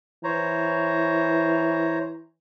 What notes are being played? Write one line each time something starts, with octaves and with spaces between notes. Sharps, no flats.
E3 C5 C#5 A#5